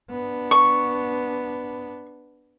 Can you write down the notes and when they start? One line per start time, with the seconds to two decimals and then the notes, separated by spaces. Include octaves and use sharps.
0.10 B3 D4
0.51 C#6